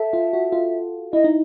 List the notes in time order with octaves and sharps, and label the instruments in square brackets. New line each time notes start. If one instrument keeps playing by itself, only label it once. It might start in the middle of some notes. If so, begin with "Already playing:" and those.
Already playing: [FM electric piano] A4 [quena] E5
[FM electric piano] F4
F#4
F4
[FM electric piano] E4 [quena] D#5
[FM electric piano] D#4